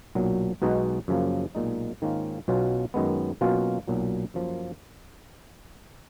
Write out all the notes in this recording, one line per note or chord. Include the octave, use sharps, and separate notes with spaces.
B1 A#2 F#3
B1 B2 G#3 D#4 F#4
F#2 C#3 F3 A#3
B1 A#2 G#3 D#4
G#2 D#3 A#3 C#4 F4
B1 B2 F#3 C#4 F4
F#2 D#3 G#3 B3
B2 F#3 A#3 C#4 F4
B1 A#2 F#3
F#2 F3 A#3